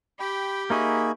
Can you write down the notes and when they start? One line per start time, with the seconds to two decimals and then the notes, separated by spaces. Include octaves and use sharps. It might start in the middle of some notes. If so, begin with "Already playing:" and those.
0.20 G4 G5 B5
0.70 A#3 D#4 F#4 G#4 E5 B5